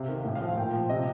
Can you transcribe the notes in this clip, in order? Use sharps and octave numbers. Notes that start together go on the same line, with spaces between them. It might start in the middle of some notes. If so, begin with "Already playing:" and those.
Already playing: C3 F5
D#3
A2
F5
F3
A#2 G5
F3
C3 D#5